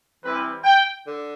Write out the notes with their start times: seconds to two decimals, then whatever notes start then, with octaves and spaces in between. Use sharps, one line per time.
0.22 E3 G3 C4 E4 B4
0.64 G5
1.06 D3